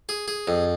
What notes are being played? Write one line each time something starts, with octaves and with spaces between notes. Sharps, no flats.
G#4
G#4
F2